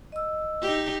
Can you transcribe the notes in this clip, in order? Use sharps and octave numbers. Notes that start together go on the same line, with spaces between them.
D#5 E6
D#4 G4